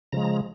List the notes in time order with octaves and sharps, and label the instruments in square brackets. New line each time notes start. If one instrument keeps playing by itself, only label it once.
[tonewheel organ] C#3 F3 G#3 A#5